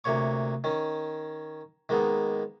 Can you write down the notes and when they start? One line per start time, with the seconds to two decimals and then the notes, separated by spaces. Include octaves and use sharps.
0.04 D2 C3 A#3 C#5 C#6
0.64 D#3 C#4
1.89 D#3 G#3 A#3 B3